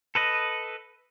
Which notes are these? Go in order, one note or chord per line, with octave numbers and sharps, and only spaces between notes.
A4 B4 D#5